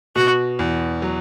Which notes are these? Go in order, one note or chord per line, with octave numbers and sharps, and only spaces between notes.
B2 F#4
E2
F#3